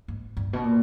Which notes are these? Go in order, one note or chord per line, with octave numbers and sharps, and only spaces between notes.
G#2
G2
B2
A#2